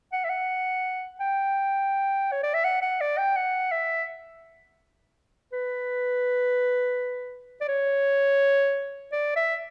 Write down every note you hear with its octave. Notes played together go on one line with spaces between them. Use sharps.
F#5
E5
F#5
G5
C#5
D5
E5
F#5
F#5
D5
G5
F#5
E5
B4
D5
C#5
D5
E5